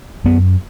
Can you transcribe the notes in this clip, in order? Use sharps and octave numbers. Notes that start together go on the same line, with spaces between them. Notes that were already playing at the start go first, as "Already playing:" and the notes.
F#2 B3